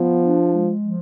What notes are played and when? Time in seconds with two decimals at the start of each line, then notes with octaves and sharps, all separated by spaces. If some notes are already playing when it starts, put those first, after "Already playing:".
Already playing: F3 B3
0.22 D4
0.51 G#3
0.81 F3